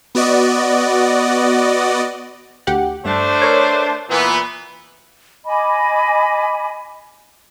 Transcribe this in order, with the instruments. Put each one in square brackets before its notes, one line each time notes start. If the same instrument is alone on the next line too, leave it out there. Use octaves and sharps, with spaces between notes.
[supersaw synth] B3 F#4 D5 D#5
[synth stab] D2 G4 F#5
[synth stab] G2 [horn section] A3 D4 C5
[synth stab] A#4 C#5
[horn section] A#2 E3 B3
[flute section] D#5 G#5 B5 D6